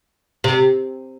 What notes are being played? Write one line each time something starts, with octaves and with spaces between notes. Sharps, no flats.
C3